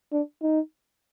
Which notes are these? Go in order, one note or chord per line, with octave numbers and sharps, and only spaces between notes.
D4
D#4